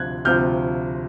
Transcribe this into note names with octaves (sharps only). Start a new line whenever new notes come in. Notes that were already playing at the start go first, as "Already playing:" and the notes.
Already playing: D2 C3 F3 F#6 G#6
D2 C3 F3 F6 G6